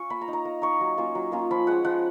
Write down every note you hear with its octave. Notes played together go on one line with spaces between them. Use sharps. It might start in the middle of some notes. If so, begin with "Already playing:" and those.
Already playing: C#4 F4 C#6
A#3 B5
A#5
D#4
A#5
A#3
D#4 C#6
F#3
A#3 C#4 F4
F#3
A#3 C#4 F4
F3 B5
G#3 C#4 F#5
F3 F#5